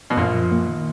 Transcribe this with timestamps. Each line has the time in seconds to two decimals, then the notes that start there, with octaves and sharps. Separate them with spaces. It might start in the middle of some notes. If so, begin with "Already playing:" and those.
0.10 B2
0.17 A#1 F#2 A#2
0.34 F3
0.52 A#3
0.68 D#3